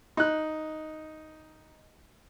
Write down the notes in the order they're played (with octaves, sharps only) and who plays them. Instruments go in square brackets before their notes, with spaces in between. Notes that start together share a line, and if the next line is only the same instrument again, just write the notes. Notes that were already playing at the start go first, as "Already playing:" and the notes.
[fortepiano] D#4 F#6